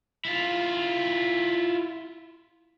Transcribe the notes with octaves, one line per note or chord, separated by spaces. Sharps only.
E4 F4